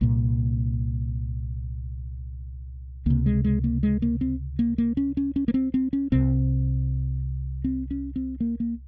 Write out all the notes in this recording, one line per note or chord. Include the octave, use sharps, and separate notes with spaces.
C2 A#2 A#3
C#2 C3 A#3
G#3
G#3
A#3
G#3
A#3
C4
A#3
A#3
C#4
C#4
C#4
A#3
C4
C4
C#4
C2 C3 C4
C4
C#4
C4
A#3
A#3